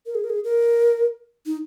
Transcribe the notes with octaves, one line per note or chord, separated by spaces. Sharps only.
A#4
G#4
A#4
G#4
A#4
D#4